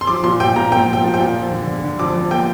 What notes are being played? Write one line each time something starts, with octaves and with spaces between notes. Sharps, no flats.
C6
F3 D6
A#2 C6
A#2 G5
A#2 A#5
A#3 G5
F3
G5
F3
G5
A#2
F2
D3
D3
D3
F2 D6
F2
A#3 G5